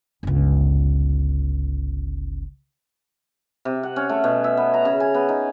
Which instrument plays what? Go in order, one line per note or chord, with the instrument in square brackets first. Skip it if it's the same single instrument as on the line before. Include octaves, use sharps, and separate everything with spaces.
[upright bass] G1 C#2
[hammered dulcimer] C3
F#5
C#4
A3
B2
E5
B3
A#5
C#3
G#5
B3
D#4